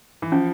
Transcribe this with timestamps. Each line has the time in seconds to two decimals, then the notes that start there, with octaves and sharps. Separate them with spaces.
0.22 E3
0.32 F3 C#4